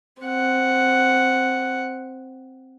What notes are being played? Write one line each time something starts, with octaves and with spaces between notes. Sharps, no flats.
C4 F#5